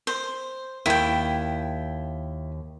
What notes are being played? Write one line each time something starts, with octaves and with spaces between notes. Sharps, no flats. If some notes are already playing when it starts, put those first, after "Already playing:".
C5
D#2 E4 G5